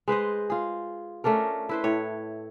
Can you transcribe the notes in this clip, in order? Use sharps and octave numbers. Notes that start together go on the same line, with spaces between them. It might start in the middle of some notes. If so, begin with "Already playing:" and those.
G#3 B4 C5 D#5
F4 G#4
A3 C#4 D4 A#4
E4 B4 C5
A2 C#5